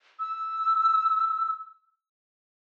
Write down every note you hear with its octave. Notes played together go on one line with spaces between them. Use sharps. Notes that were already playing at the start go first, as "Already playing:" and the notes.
E6